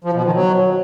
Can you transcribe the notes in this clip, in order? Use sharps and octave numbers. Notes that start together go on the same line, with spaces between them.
F3
B2
D#3
F#3